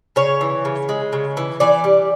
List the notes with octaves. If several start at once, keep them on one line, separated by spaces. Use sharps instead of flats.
C#3 C#5
E3
C#3
G#3
C#3
E3
E3 D5
G3